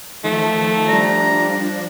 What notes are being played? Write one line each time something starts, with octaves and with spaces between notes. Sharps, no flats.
D#3 F3 A3 A4
F3 G3 D4 A#5